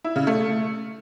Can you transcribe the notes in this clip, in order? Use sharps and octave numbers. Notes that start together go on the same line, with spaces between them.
E4
C#3
A3